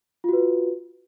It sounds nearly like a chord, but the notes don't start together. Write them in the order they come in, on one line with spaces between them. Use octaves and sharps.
F4 F#4 B4